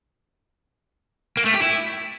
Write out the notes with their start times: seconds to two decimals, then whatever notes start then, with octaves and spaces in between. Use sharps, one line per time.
1.37 A#3
1.45 A3
1.54 G4
1.62 E4